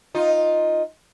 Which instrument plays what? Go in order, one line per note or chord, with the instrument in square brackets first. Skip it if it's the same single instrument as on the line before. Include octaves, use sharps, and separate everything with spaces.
[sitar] D#4 F4